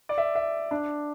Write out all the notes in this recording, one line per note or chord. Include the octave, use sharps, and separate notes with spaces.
D5
E5
E5
D4